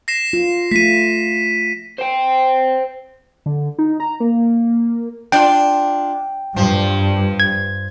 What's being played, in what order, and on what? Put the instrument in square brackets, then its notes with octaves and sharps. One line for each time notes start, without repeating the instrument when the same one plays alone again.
[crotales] A#6 C7 E7
[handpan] F4
[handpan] A3 F4 [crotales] B6 D#7
[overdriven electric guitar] C5 G5
[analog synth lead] D3
D#4
A#5
A#3
[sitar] D4 F4 [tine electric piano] G5
[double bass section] G2 [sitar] F3
[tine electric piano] G#6